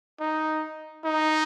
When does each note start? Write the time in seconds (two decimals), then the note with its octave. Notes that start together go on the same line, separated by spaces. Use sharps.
0.20 D#4
1.05 D#4